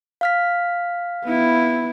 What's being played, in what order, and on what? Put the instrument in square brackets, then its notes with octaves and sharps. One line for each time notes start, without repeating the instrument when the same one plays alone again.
[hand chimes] F5 F6 B6
[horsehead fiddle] B3 E4